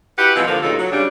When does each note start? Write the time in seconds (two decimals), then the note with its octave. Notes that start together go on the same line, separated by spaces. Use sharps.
0.19 E4 F#4 G4 B4 F#5
0.36 B2 E3 F3 G#3 C4 E4
0.48 D3 F3 A#3
0.63 D2 G2 A#2 C#3 D#4 A4
0.79 F#3
0.92 C#3 G3 D4